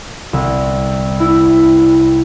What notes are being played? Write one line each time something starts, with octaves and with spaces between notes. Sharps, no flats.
C2
E4